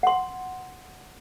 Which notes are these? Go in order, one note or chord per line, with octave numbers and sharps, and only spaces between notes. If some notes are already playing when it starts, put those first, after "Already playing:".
F#5 C6